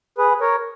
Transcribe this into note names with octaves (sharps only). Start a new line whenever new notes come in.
G#4 B4
A#4 C#5